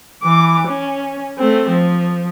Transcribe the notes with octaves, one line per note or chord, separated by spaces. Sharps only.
E3 D6
C#4
A3 C4
F3